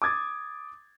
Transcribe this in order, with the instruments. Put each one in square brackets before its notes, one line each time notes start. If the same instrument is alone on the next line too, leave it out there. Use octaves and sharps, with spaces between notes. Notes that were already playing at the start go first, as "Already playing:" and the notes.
[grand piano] D6 D#6 G#6 A6